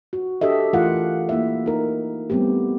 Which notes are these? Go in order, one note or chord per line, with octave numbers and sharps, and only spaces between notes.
F#4
D4 G4 A4 D#5 E5
E3 A3 F4 A#4 F5 F#5
A#3 E4 E5
D#4 A#4
G3 A3 B3 C4 G4